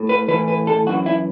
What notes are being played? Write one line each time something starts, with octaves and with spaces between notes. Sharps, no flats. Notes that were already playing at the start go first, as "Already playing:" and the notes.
Already playing: A2
B4
A2 E3 B4
B4
A4
F#2 E3 F#4
E4